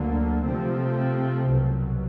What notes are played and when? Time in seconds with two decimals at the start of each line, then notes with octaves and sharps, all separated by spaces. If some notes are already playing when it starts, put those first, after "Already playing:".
Already playing: D2 D3 F#3 A#3
0.45 C3 F3 A3 C4
1.50 C2 B2 F#3